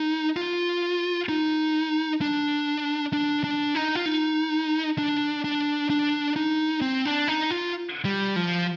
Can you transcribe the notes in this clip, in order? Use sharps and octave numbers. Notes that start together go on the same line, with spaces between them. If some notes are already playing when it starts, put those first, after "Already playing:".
Already playing: D#4
F4
D#4
D4
D4
D4
D#4
F4
D#4
D4
D4
D4
D#4
C4
D4
D#4
F4
G3
F3